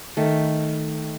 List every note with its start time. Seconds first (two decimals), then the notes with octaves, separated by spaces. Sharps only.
0.17 D#3 A3